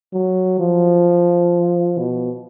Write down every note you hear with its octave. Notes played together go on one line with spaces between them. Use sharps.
F#3
F3
B2